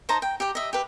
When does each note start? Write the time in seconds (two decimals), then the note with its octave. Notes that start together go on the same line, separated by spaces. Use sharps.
0.09 D#4 C5 A5 A#5
0.22 G5
0.40 G4 G5
0.55 D#5 E5
0.73 G4 B4